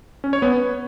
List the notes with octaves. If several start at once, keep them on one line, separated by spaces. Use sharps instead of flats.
C#4
C#5
B3